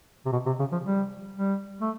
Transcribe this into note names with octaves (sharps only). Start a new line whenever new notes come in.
C3
B2
C3
C#3
F3
G3
G3
A3